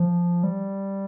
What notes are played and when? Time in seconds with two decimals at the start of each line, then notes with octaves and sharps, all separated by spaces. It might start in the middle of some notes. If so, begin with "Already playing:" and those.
Already playing: F3
0.44 G3